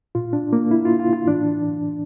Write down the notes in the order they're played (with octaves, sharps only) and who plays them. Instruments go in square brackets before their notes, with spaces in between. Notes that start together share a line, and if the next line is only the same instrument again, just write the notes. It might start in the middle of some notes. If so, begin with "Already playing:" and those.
[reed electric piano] A#2 F4
D4
A#3
E4
F4
F4
F4
A2 E3 D4